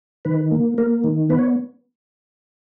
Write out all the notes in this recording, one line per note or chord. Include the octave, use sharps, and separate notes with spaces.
D#3 B4
A#3
A#3 A#4
D#3
B3 B4
C#5